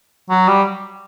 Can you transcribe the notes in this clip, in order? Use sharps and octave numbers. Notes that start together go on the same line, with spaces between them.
F#3
G3